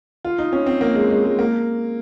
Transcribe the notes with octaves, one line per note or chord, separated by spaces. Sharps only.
F4
D#4
C#4
C4
A#3
G#3
G#3
G#3
A#3